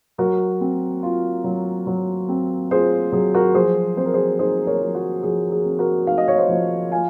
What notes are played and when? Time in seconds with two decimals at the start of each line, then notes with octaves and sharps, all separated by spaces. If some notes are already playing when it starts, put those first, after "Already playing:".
0.18 F#3 F#4 A#4
0.61 C4
1.03 F4
1.44 F#3
1.87 F#3
2.29 C4
2.71 F4 G#4 C5
3.12 F#3 G#4
3.34 F#4 A#4
3.55 F3 G#4 C5
3.97 C4 C5
4.05 A#4
4.13 G#4 C5
4.39 D#4 G#4 C5
4.67 A#4 C#5
4.81 F3
4.95 F#4
5.23 F3 G#4
5.52 G#4
5.65 C4
5.79 F#4 A#4
6.07 D#4 F5
6.18 D#5
6.28 C#5
6.38 C5 D#5
6.49 F3
6.91 F4 F5 G#5